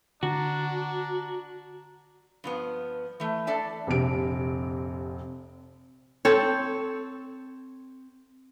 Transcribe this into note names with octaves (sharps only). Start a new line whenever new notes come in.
D3 D4 F#4 A#5
G2 F3 B3
E3 A3
D4 A4 D5 E5 A5
F1 A#1 C3 D7
C4 A4 C#5